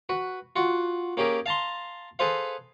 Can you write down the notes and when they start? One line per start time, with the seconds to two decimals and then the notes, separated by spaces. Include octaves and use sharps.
0.09 F#4 B4
0.56 F4 F#4 F#5
1.17 A#3 C#4 G4 G#4 A#4
1.46 F5 A5 A#5 C6
2.19 G#4 A4 B4 C5 F5